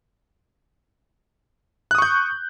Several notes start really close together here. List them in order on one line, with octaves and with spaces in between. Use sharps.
F#6 D#6 C#6 G6